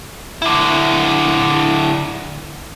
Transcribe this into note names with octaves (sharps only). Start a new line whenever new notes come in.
D3 E4